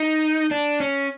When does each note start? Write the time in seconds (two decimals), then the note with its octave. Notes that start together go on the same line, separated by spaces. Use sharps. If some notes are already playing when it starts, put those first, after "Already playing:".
Already playing: D#4
0.51 D4
0.80 C#4